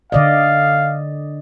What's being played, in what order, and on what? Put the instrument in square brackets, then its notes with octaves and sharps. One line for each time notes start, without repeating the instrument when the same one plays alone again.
[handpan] D3 D5 D#5 [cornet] F5